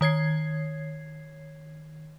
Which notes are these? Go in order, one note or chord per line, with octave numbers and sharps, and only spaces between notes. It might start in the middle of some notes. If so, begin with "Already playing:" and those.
D#3 C#5 G#6 C7